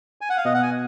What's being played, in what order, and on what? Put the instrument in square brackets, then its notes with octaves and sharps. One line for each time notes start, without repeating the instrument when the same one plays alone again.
[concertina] G#5
F#5
F5
[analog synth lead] B2 [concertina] D#5
[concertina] F#5
G#5